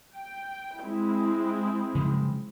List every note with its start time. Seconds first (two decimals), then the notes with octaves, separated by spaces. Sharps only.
0.14 G5
0.83 G#3 C4 E4
1.95 C#3 F3 F#3